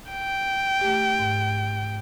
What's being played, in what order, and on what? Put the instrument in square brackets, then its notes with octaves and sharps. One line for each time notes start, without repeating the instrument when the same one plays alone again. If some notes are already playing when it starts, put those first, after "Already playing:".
[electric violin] G5
[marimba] A3 G4
G#2